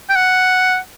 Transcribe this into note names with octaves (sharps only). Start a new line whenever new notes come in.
G5
F#5